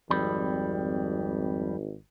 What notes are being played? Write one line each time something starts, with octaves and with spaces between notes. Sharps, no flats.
G#1 F2 G3 B5